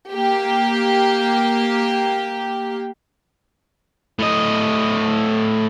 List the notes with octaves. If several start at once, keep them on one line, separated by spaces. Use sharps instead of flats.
A#3 G4
A2 D#5